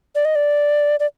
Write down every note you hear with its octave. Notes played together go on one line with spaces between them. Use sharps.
D5
D#5
D5
D5